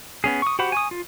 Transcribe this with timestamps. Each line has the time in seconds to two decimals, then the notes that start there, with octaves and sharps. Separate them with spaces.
0.24 B3 C#4 G#4
0.42 C#6 D#6
0.59 F#4 G4 C5 F#5 B5
0.72 G#5 C#6 D#6
0.91 F4